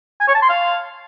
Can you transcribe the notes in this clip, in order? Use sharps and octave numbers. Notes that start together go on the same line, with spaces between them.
G#5
C#5
A5
C6
F5